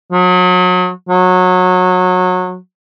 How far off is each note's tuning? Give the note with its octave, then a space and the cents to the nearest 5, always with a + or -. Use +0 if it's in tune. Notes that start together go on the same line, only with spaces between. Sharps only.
F#3 -35
F#3 -20